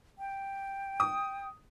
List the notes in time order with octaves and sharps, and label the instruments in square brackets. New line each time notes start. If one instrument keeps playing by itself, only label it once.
[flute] G5
[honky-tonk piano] D#6